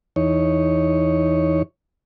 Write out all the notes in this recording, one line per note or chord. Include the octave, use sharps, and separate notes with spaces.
E2 D#4 C#5